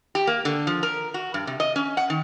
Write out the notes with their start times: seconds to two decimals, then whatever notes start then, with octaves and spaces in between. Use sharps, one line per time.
0.15 G4
0.27 A#3
0.45 D3
0.67 F3
0.83 A#4
1.14 F#4
1.34 G2
1.47 C3
1.60 D#5
1.76 C#4
1.97 F#5
2.10 D#3